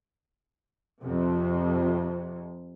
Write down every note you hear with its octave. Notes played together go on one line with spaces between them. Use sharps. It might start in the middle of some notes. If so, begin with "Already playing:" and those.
F2 C3